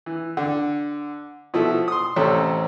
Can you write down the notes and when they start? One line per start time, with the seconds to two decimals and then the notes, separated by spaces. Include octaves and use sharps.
0.06 E3
0.37 D3
1.54 B2 F3 E4 A4
1.88 C6 D#6
2.16 A1 C3 C4 C#4 A4